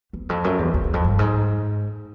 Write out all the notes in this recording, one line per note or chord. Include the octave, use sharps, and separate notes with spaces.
E2
F2
F#2
E2
E2
E2
F2
G2
G#2